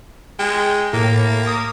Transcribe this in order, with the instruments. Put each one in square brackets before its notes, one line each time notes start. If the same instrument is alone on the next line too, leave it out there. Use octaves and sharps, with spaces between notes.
[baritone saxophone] G#3 [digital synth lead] G5
[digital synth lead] A2 [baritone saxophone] A#3
[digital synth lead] D#6